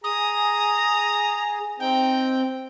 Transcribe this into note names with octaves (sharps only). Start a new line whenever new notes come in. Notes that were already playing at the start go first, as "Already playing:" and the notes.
G#4 A#5 D#6
C4 D#4 G5